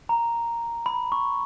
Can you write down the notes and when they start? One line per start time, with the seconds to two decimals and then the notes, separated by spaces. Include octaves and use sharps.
0.09 A#5
0.86 B5
1.12 C#6